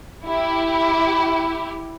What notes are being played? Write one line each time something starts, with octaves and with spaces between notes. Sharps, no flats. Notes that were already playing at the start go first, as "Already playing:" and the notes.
E4 G4